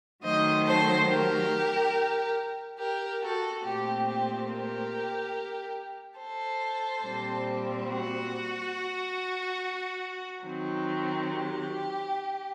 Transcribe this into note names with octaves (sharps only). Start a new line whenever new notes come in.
D#3 F#3 A3 C5 D#5
A4 C5
G4 A#4
G4 A#4
F#4 A4
A#2 A3 C4 G4
G4
G4 A#4
A4 C5
A#2 G3 C4
F#4
D#3 F#3 C4
G4